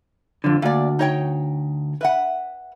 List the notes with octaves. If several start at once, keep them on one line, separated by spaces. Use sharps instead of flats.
F2 D3
D2 A#3 D5
D#4 C#5 G5
B4 E5 F#5